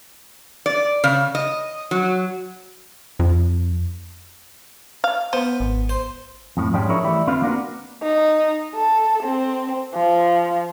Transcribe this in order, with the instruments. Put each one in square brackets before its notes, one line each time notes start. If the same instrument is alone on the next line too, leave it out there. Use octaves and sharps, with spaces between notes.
[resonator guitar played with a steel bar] D5
C#3
D#5
F#3
[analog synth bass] F2
[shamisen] F5
[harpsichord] B3 [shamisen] C5
[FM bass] G#1
[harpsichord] C5
[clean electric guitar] F2 A2
G#2 F3 G3 G#3 C#4 G5
D4 E4 G#4 A#4 C#5
E3 G3 A3 E4
F2 D3 C4 F4 B4 F5
A#3 C4 D4 F#4 A#4 B4
[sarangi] D#4
A4
C4
F3